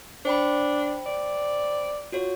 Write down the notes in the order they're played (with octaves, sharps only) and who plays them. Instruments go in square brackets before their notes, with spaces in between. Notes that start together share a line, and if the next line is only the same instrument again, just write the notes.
[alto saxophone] D4 [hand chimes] C5 G5 B5
[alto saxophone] D5
[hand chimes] F4 F#4 C#5